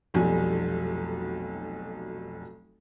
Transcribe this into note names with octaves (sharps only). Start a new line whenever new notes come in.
F1 B1 F2 F#3 G3 G#5